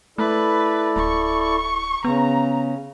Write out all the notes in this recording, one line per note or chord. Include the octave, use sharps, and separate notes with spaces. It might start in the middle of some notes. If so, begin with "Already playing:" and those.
A3 E4 A4 B4 D5
D1 C#6
C#3 B3 A#5